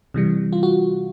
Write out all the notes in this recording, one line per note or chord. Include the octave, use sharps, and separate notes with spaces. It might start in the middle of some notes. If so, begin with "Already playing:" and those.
C3 E3 G3
F4
F#4